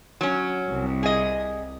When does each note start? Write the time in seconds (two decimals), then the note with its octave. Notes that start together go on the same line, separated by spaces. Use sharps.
0.21 F#3 C#4
0.68 C2
1.03 G#4 D#5